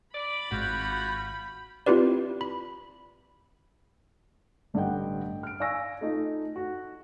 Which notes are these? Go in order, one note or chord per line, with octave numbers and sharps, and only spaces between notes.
D5 B5
G#1 G#2 F4 F#4 G6
C4 E4 F4 G4 B4 D5
B5
A1 G2 D3 D#5 F#5 G5
F6 D7
D5 F5 G#5 C#6 E6 A#6
A3 D#4 F4
F#4